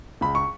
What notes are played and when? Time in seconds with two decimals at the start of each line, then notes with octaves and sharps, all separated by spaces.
0.21 C#2 B5
0.35 C#6